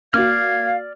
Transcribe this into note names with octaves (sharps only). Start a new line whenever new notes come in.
A#3 F#4 D5 F5 D6 F6 G#6